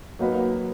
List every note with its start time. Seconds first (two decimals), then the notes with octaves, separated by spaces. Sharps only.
0.19 F#3 A#3 D#4 F#4 B4